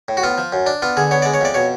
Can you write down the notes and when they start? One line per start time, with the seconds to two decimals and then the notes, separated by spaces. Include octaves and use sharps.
0.08 A2
0.17 F#4
0.23 B3 F4
0.38 F3
0.53 F#2
0.66 D4
0.82 B3 F4
0.97 D3 G#4
1.11 B3 C#5
1.22 G#3 D5
1.34 C#5
1.41 F2 D5
1.54 B2 C#5